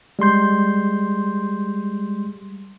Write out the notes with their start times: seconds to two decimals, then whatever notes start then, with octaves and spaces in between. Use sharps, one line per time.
0.19 G3 G#3 C6 G6